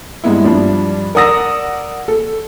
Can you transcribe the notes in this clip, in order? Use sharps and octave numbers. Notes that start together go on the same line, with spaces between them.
G2 G#3 B3 E4
G2 F3 D4
A#4 D5 F#5 D#6 E6 A#6
A4